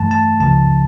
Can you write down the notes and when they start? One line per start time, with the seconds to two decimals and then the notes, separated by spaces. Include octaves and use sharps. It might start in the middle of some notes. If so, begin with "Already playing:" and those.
Already playing: G2 E3 A3 A5
0.11 A5
0.40 C#2 C#3 F3 A5